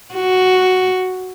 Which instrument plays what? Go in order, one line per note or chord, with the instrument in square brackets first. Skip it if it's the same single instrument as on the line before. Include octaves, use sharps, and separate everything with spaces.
[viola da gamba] F#4